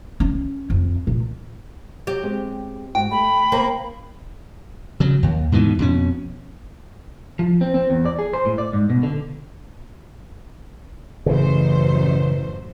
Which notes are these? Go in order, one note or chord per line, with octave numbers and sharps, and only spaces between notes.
C#4
F2
A#2
F#3 G4
G#3 C4
G#2 F#4 G5
A3 B5
A#3 B3 C5
C#3 F#3
D#2
G#2 B2 D#3 E3
F2 B2 C#4
F3
C4
C4
E2
D5
G#4
C5
A2
D5
G#2
B2
D3
A1 F#2 C#3 E3 C5